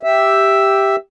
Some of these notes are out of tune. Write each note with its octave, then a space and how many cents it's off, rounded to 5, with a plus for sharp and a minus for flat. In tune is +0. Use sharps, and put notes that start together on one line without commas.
G4 +0 E5 +0